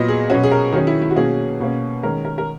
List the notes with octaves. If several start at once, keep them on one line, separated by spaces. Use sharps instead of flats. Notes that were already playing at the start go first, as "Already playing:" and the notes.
Already playing: A#2 F#3 B3 D#5
G#4
B2 F#3 C#4 F#4
G#4
A#4
D#3 F#3 C#4 G#4
E4
E4
F#4
B2 F#3 A#3 C#4 G#4
B2 A#3 C#4
D#3 G#3 C#4 A#4
A#4
A#4